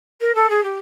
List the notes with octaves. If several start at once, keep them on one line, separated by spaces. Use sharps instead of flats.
A#4
A4
G#4
G4